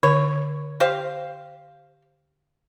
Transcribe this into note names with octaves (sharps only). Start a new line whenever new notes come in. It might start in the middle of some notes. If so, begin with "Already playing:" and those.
D3 C#5
G4 C5 F5